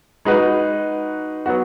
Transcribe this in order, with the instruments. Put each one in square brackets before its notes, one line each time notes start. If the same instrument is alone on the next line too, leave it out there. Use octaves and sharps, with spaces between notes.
[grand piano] G#3 D#4 F#4 B4
F#3 B3 F#4